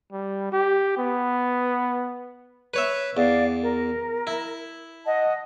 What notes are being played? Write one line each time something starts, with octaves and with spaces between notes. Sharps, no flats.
G3
G4
B3
B4 C#5 E5
E2 D5 F5
A#4
E4
D#5 F#5 A5